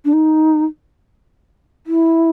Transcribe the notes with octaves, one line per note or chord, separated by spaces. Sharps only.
D4
D#4
E4